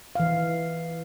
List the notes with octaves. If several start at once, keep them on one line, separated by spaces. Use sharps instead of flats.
E3 F5